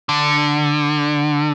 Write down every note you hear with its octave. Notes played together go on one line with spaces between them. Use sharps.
D3